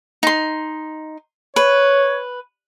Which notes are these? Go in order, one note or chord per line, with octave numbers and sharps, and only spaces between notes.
D#4 C6
B4 C#5